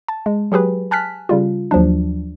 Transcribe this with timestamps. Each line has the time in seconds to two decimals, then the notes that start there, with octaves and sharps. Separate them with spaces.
0.08 A5
0.26 G#3
0.52 F#3 G4 G#4 B4
0.91 G#5 A5 F6 F#6 B6
1.29 C#3 G3 F4
1.71 D#2 F3 F#3 D4